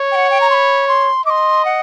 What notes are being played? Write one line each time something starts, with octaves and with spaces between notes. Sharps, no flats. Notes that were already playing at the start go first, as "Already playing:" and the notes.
Already playing: C#5
G5
F#5
G5
A#5
C6
B5
C6
D#5 C6 D6
F#5